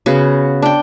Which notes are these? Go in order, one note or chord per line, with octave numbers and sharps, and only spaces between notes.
C#3 B3 F#4
D4 G5